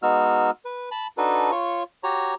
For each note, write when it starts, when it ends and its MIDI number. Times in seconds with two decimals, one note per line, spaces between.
0.03 0.51 56
0.03 0.51 59
0.03 0.51 63
0.03 0.51 66
0.03 0.51 88
0.03 0.51 89
0.65 0.89 71
0.91 1.07 81
0.91 1.07 83
1.18 1.51 62
1.18 1.51 63
1.18 1.51 66
1.18 1.51 69
1.18 1.51 71
1.51 1.83 65
1.51 1.83 73
1.51 1.83 85
2.04 2.34 66
2.04 2.34 67
2.04 2.34 73
2.04 2.34 82